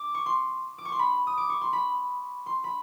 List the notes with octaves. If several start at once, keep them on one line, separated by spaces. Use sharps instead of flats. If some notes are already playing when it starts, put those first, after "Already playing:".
Already playing: D6
C#6
C6
D6
C#6
C6
B5
D#6
D6
C#6
C6
B5
C6
B5